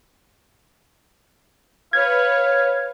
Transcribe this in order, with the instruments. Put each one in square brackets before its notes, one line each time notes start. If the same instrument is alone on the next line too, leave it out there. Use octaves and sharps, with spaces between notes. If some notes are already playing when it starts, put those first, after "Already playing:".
[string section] B4 C#5 [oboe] F5 [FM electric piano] G#6